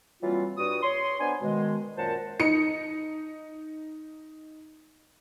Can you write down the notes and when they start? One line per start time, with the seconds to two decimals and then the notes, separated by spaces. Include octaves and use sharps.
0.21 E3 F#3 G3 A#3 C4 F4
0.58 G2 F#4 D#6
0.82 C#5 C6
1.19 B3 D4 C5 G#5
1.41 B2 D#3 G#3
1.97 F#2 A#2 A#4 C5 F#5 A5
2.39 D#4 C#7